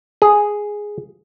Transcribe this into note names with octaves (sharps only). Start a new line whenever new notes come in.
G#4